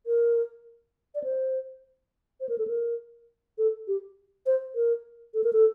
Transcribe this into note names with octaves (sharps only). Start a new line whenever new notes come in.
A#4
D5
C5
C5
A#4
A4
A#4
A4
G4
C5
A#4
A4
A#4
A4